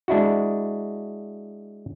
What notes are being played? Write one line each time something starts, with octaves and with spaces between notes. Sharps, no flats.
G#3 D4 E4 F#4